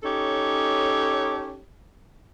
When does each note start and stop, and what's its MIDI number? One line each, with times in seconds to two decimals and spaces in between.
0.03 1.60 61
0.03 1.60 63
0.03 1.60 67
0.03 1.60 69
0.03 1.60 73